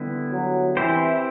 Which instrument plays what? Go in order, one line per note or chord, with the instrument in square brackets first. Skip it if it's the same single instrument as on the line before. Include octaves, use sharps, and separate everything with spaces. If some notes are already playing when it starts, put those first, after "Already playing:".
Already playing: [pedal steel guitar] D3 G3 B3 E4
[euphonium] F#3
[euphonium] E3 [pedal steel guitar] C4 E4 G4 C5